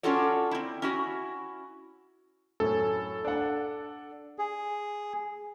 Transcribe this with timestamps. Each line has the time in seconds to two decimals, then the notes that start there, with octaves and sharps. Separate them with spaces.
0.03 C#4 D4 F4 F#4 A4 C#5
0.51 C4 E4
0.82 C#4 E4 F#4
2.60 F#2 A2 C#4 A4
3.25 D4 F#5
4.39 G#4